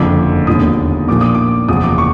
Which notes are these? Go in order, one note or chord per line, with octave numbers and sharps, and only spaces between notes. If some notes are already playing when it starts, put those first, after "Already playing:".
Already playing: F#1 F2 D3 F3 D6
E1 D#2 D3 F3 D#6
A#1 A#2 F3 D6
D#6
D6
F#1 E2 C3 F3 D#6
D6
C#6